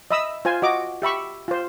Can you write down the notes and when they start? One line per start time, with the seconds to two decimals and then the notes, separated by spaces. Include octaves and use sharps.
0.11 D#5 E5 B5 D#6 E6
0.45 F4 C5 G#5
0.62 F#4 D#5 D6
1.02 G4 E5 B5 C#6
1.48 F4 C5